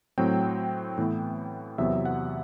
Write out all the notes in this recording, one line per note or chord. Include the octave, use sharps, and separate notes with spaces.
A2 F#3 C4 G5
A2 E3 B3
E2 C3 F#3 B3 E5
F#5